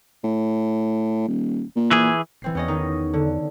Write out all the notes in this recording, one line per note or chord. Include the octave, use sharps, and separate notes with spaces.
A2
D#1
A#2
E3 G#4
D#1 E3 C4 C7
E2 B3 C#4 D#5
D#3 D#4
D3